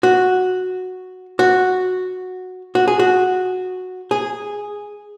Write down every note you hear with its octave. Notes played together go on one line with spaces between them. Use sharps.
F#4
F#4
F#4
G#4
F#4
G#4